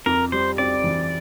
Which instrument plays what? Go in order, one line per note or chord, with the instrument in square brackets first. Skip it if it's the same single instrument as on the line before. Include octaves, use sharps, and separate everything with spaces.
[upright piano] F2 [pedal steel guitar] A#4
[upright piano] G3 [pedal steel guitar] C5
[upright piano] C4 [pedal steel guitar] D5
[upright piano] E3